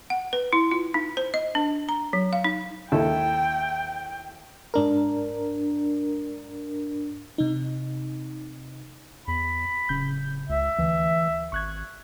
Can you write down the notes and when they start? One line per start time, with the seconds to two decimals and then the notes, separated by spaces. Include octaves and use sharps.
0.10 F#5
0.33 B4
0.53 E4
0.71 F4
0.94 D#4
1.17 C5
1.34 D#5
1.55 D4
1.89 A#5
2.13 F#3
2.33 F5
2.44 D#4
2.92 D#2 E4 A4 G5
4.74 G#2 D4 A#4
7.38 C3 D#4
9.28 E2 B5
9.89 D1 C#3 G6
10.49 C#2 E5
10.79 D2 E3
11.52 G#1 C#6 F#6 G#6